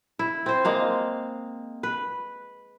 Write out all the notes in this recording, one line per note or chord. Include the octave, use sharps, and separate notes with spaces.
E4
C4 C5
G#3 A#3 F5
B4